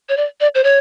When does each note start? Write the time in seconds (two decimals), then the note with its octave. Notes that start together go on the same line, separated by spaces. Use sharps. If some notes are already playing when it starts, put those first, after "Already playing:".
0.09 C#5
0.17 D5
0.41 D5
0.55 C5
0.64 C#5